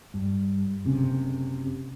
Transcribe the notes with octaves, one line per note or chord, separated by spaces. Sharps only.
G2
F#1 C3 C#4